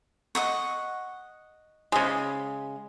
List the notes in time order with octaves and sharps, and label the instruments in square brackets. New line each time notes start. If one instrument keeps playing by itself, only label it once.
[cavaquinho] D#5 F#5 C#6
[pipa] C#3 G#3